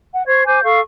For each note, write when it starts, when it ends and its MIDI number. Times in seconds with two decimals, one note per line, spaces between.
0.14 0.23 78
0.27 0.44 72
0.27 0.44 85
0.27 0.44 92
0.46 0.62 72
0.46 0.62 80
0.46 0.62 86
0.46 0.62 91
0.63 0.80 69
0.63 0.80 77
0.63 0.80 85